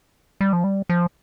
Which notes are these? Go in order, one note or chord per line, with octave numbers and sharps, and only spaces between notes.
G3
F3
G3
F3